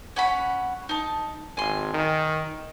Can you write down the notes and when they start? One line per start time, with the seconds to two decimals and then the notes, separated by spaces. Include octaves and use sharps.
0.16 C#4 F#5 B5
0.89 D#4 A5
1.57 G#1 G#5 C6
1.93 D#3